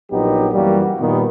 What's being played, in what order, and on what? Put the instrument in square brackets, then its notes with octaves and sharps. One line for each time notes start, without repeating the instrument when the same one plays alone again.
[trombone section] A#1 A#2 F#3 B3 D#4 G4
F#2 E3 G3 A#3 F#4
A#2 D#3 G3 B3